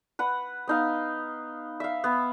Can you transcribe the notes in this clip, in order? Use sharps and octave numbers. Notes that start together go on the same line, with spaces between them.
B4 F#5
B3 D#4 F5
E5 F5
B3